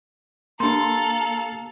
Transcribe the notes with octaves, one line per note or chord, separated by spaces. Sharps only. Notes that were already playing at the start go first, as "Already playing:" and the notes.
A#3 D4 G4 A4 F5 A#5 C6